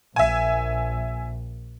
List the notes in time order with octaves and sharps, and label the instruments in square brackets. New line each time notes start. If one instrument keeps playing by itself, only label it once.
[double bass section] A#1 [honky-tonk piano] E5 G#5